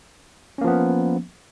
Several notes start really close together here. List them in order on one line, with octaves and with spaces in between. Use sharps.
C#4 A#3 F3 B3